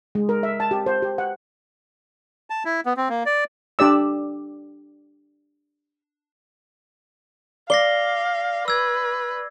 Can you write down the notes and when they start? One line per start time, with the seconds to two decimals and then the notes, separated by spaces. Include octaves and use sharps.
0.15 G#3
0.29 A#4
0.43 E5
0.60 A5
0.71 G4
0.86 C5
1.02 G4
1.18 F#5
2.50 A5
2.65 E4
2.86 B3
2.97 C4
3.09 A#3
3.26 D5
3.79 D4 G4 D5 E6
7.70 D5 F5 A#6 C7 G7
8.68 B4 E6 G#6